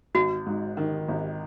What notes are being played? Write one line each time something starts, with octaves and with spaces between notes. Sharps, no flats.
G#1 F#4
G#2
D#3
G#1